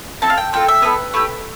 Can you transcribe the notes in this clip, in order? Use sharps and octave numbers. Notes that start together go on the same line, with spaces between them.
C4 E4 A4 A5
F5
G5
C4 F4 A4 G5
E5
B3 E4 A4 B4
A3 E4 G4